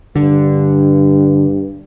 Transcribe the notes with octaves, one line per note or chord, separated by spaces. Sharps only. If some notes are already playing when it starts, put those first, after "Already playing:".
G2 D3